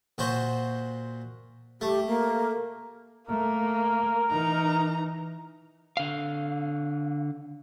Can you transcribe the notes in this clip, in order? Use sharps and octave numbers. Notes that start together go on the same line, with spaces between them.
A#2 F#4 C5
A3 G4
A#3
A3 A#3 A#4
E3 D#4 A#5
D3 F5